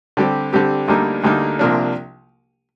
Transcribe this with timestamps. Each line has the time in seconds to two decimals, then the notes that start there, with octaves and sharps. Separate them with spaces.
0.17 D3 G3 C4 G4
0.53 D3 G3 C4 G4
0.88 D2 D3 G3 A#3 D#4
1.23 D2 D3 G3 A#3 D#4
1.59 C2 C3 F3 A#3 D4